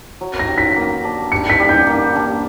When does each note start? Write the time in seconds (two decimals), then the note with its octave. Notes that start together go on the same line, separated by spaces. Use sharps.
0.21 F#3
0.39 A#6
0.48 G4
0.58 B6
0.76 A#3
1.04 D4
1.32 G3 C#7
1.50 B6
1.60 G3
1.69 G6
1.87 A#3
2.16 D4